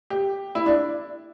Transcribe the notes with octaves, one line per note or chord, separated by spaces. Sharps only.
G4
E4
D4